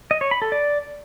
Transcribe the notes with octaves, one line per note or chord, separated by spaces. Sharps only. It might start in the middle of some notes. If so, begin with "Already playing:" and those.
D#5
C#5
B5
A4
D5